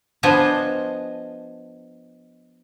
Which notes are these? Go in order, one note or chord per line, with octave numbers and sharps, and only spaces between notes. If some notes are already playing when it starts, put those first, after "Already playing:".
F3 B3 D4 C5 D#5 G#5